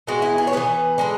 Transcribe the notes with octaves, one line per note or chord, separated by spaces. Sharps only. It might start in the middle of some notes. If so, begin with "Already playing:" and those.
E3 G#3 B3 F#4
E4
G#4
C#5
E3 G#3 B3 B4
D3 G#3 D4